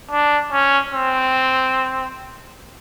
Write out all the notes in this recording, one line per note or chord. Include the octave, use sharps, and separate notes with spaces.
D4
C#4
C4